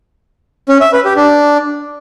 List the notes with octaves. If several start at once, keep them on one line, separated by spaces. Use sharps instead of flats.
C#4
E5
B4
G4
D4